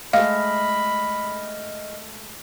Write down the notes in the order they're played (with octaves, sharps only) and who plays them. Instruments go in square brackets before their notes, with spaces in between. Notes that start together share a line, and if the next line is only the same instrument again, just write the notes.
[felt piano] G#3 A3 [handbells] D#5 F6 [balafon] F5 [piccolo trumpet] B5